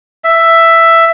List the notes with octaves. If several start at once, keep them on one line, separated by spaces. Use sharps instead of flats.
E5